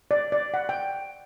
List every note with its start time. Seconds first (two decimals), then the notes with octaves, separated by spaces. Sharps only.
0.11 D5
0.32 D5
0.54 F#5
0.69 G5